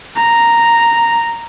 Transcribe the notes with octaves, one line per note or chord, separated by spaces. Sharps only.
A#5